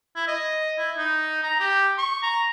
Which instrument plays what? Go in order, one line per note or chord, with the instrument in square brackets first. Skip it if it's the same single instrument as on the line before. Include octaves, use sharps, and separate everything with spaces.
[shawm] E4
D#5
E4
D#4
A#5
G4
C#6
A#5